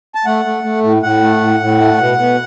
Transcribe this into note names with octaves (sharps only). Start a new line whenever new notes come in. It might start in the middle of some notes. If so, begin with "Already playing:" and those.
A5
A3 F#5
A3
A3
A2
A2 F#5
A3
A2
A2
A3
B2
B2